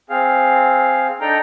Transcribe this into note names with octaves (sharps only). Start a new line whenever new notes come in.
C4 G#4 F5
D4 D#4 A4 G5 A#5